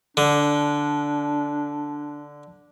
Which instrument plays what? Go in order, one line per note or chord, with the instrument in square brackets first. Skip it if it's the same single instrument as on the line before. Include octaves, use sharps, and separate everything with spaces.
[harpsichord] D3 [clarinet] D4